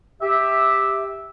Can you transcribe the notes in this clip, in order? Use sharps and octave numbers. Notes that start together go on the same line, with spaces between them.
G4 E5